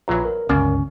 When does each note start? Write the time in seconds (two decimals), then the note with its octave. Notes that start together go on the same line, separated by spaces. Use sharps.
0.08 A#1 E2 E3 F#3 F4 A#5
0.25 A#4
0.49 G1 C#2 F#2 C#4 D5 F5